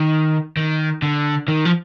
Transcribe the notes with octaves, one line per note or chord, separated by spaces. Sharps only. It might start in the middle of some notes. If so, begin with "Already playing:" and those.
Already playing: D#3
D#3
D3
D#3
F3